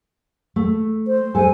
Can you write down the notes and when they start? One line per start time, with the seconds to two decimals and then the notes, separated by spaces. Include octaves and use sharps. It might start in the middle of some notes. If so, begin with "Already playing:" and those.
0.56 A3
1.07 C5
1.35 G#3 A4 G#5